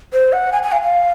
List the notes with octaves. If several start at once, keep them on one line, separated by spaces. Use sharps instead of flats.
C5
F#5
G#5
G#5
F5
F5